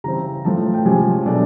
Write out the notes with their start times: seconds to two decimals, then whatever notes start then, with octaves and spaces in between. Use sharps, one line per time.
0.04 C#3 E3 G3 C4 A#5
0.45 A2 F3 A3 C4 A5
0.74 G5
0.85 C3 F3 G#3 C#4 G#5
1.26 B2 F#3 A3 D4